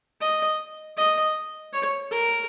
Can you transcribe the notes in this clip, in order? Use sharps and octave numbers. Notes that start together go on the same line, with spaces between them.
D#5
D#5
C#5
A#4